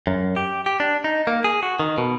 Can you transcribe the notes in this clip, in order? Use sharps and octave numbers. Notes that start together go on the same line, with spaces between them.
F#2
G4
G4
D4
D#4
A#3
G#4
F#4
D#3
B2